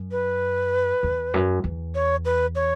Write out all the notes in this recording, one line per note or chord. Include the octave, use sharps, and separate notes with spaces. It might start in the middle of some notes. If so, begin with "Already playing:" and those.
Already playing: F#2
B4
E2
F#2
E2
C#5
B4
C#5